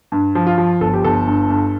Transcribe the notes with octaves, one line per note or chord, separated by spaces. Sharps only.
G2
F3
F4
F3
G1 A4
G4
G1 A4
G2
G2